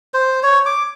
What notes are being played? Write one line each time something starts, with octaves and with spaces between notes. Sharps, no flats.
C5
C#5
D6